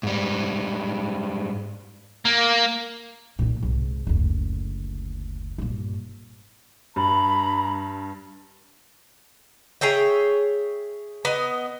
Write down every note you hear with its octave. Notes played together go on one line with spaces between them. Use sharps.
G#2 G3
A#3
A#2 D#3
C2 G#2
F#1 D2
G2 A#2
G2 A#5 B5
G#4 C#5 E5 G5
B3 D#5